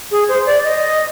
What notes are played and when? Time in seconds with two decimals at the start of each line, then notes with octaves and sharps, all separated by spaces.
0.11 G#4
0.28 C5
0.46 D5
0.64 D#5